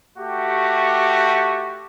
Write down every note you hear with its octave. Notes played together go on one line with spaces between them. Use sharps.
A3 F#4 G4